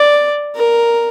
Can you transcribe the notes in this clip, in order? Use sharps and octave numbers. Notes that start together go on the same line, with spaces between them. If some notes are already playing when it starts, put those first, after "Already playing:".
Already playing: D5
A#4